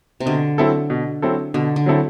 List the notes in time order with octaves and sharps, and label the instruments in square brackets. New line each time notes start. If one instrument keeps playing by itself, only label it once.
[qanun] C3
[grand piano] B2 [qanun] D3
[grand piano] F#3 C4 E4 A4
B2
F#3 C4 E4 A4
[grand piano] B2 [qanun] D3
[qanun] D3
[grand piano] F#3 C4 E4 A4